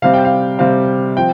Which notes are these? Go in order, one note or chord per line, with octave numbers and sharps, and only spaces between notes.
C3 G3 C4 F5
G5
F5
C3 G3 C4 F5
F3 C4 G5